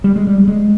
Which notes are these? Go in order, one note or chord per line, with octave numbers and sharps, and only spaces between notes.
G3
G#3
G3
G#3